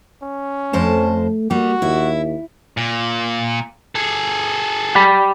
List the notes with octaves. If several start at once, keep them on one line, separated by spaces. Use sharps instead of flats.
C#4
F2 A3 C5 A5
G3 A#3 F#4
D#2 E4
A#2
G#4 A4
G4 D5 B5